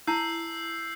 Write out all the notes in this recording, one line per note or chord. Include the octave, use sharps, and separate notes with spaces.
E4 A5 E6 G6 C7